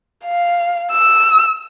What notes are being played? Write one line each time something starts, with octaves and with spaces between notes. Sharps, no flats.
F5
E6